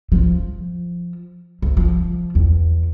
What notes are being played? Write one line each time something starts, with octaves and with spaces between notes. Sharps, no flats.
F3
D2
F3
E2